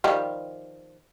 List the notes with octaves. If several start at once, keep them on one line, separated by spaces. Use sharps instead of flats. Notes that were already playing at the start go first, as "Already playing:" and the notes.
D#3 F3 G3